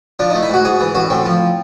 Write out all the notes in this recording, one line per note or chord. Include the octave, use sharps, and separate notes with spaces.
F3 D4
A3 D#4
E4
G#2 F#4
G#2 G#4
E3
A1 F#4
A2 C4
F3